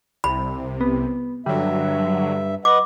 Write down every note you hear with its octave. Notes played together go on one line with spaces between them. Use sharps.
C2 C3 B5
B3
G2 D3 F#3 G3 E5
B4 D#5 F#5 D6